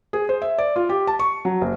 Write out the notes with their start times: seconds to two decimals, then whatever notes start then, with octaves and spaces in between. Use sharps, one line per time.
0.13 G#4
0.29 C5
0.42 E5
0.58 D5
0.76 F4
0.89 G4
1.07 A5
1.19 C#6
1.45 F#3
1.61 F#1